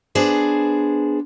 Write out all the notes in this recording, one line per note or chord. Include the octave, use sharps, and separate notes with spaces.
B3 D4 G#4 C5